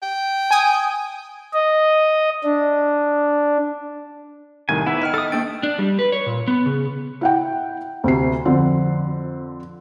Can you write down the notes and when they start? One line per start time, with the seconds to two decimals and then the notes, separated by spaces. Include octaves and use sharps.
0.03 G5
0.51 G#5 D#6
1.54 D#5
2.44 D4
4.69 C2 A2 D#3 G#5
4.86 B3 D#4 E4 B4 F#5 E6
5.02 D#5 G5 F6 F#6
5.14 A4 D#5 D#6 E6
5.32 A#3 D4 G5 A6
5.63 D4
5.78 G3
5.99 B4
6.12 C#5
6.26 A#2
6.48 B3
6.66 C#3
7.21 E4 F#5 G5
8.04 D2 C3 C7
8.45 F2 D3 C4